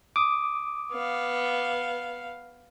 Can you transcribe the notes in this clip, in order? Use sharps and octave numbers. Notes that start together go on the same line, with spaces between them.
D6 D#6
B3 F5